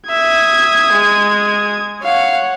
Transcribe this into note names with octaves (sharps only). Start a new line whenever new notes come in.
E5 D#6 G#6
G#3
C#5 F5 F#5